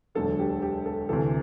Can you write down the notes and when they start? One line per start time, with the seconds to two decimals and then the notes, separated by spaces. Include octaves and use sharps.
0.15 E1 D2 D3 F#3 A4
0.39 G4
0.62 G4
0.86 A4
1.09 D2 C3 E3 A4